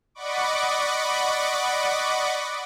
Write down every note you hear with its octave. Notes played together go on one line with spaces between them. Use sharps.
D5 D#5 F#5 B5 C#6 D6